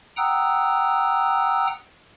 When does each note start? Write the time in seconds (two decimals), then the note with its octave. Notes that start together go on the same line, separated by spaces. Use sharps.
0.17 F#5 G5 A#5 D#6 E6 F#6